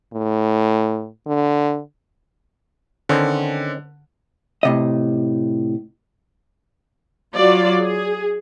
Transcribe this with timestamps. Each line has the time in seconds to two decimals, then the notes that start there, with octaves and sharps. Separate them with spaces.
0.13 A2
1.27 D3
3.09 D3 D#3 C4 C#4
4.63 A2 C3 D#5
7.36 F#3 F4 D5
7.81 G#4